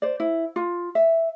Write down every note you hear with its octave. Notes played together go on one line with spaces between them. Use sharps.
C5 D5
E4
F4
E5